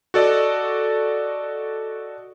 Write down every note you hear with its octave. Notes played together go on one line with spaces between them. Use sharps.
F#4 A4 D5 D#5